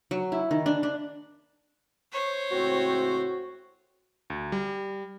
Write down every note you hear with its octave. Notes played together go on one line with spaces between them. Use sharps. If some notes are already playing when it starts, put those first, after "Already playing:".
F#3
E4
D#3
D4
D4
C5 C#5
C#2 A2 C4 F#4
D2
G3